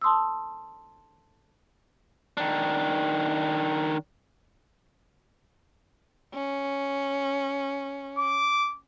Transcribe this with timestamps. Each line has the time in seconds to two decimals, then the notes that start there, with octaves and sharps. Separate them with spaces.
0.02 A5 C6 D#6 E6
2.37 D#3 D4
6.34 C#4
8.18 D6